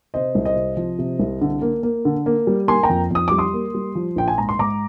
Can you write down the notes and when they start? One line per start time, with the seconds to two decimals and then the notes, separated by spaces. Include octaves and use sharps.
0.14 C3 C5 D#5
0.35 C2
0.45 C5 D#5
0.56 C3
0.77 F3
0.99 C3
1.19 C2
1.41 D3
1.62 A#3
1.83 A#3
2.05 D3
2.26 A#3
2.47 G3
2.68 A#3 G#5 C6
2.83 G5 A#5
2.89 F2
3.11 F2 D#6
3.28 G3 D6
3.38 C6 D#6
3.53 A#3
3.74 G3
3.95 F3
4.16 A#1 G5
4.28 G#5
4.38 G#2 A#5
4.49 C6
4.59 G#2 A#5 D6